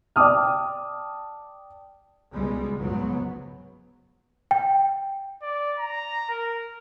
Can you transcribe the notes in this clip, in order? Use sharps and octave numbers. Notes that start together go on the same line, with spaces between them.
D5 G5 A5 D6 D#6 F6
C#2 B2 G3 G#3
F1 C#2 G#2 F#3 B3
G5
D5
A#5
A#4